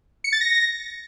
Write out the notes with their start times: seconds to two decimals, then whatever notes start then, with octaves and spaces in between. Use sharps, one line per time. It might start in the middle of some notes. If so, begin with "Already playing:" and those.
0.24 C#7
0.33 A6
0.41 A#6